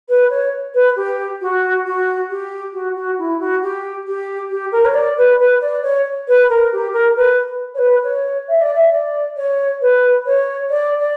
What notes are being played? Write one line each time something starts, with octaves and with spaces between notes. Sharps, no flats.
B4
C#5
B4
G4
F#4
F#4
G4
F#4
F#4
E4
F#4
G4
G4
G4
A#4
C#5
D5
B4
B4
D5
C#5
B4
A#4
G4
A#4
B4
C#5
B4
C#5
E5
D5
E5
D5
C#5
B4
C#5
D5
D5